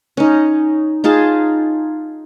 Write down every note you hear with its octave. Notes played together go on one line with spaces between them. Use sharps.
C#4 D#4
D#4 F4 G#4 A5